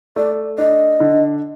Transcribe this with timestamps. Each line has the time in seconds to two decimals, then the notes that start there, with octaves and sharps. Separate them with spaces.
0.16 A3 D5
0.58 D4 D#5
1.00 D3